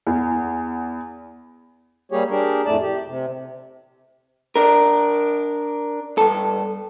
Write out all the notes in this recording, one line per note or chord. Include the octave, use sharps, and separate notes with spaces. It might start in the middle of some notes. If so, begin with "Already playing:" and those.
E2
G3 A#3 G4 G#4 C#5
D4 G4 G#4 A#4
F2 A2 A3 D5 A5
G4
C3
D4 A#4
G2 A4